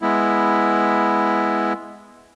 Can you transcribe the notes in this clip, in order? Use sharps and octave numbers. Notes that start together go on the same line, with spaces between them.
G#3 B3 E4